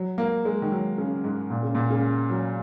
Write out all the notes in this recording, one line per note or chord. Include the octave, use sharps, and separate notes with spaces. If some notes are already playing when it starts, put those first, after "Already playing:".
Already playing: F#3
A#3
G#3
D#3
F#3
C#3
G#2
A#2
C#3
A#2
C#3
F#3